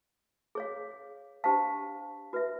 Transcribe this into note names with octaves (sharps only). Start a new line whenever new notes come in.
G#4 C#5 F5
D4 G4 C5 F5 A5
F#4 B4 E5